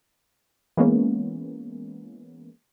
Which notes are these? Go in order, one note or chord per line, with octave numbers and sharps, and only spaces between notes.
E3 G#3 A#3 B3 C#4